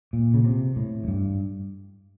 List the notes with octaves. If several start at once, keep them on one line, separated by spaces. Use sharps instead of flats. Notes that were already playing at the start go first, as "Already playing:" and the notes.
A#2
C#3
C3
A2
F#2
G2